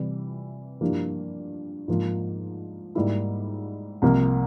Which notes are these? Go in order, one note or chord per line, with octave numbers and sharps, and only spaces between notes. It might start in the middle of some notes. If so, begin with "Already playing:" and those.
Already playing: C3 E3 G3
G2 F3 A#3 E4 G4
G#2 F3 A#3 F4
G#2 G3 A#3 E4
C2 C3 F3 A#3